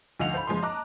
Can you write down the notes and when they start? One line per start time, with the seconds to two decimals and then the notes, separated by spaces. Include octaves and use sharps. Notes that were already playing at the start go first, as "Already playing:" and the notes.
0.20 D2 F3 D#5 F5 F#5 F7
0.34 C5 B5
0.47 F#1 F3 G#3 G#5 C6
0.62 D#5 A5 A#5 D6 F#6